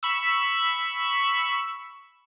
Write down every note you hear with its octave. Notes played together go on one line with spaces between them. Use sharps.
B5 C#6 E6